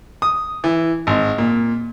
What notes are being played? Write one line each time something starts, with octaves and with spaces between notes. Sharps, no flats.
D#6
E3
G#1
A#2